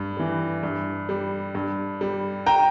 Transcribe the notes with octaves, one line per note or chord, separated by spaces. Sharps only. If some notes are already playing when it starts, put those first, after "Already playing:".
Already playing: G2
E3 G3
G2
G3
G2
G3
G5 A#5